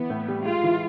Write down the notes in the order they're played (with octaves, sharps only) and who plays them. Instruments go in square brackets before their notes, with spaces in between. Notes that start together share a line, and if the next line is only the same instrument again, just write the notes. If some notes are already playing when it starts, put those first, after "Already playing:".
Already playing: [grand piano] E3 [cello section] B3
[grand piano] A2
G3
[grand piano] G#3 [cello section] F4
[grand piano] E3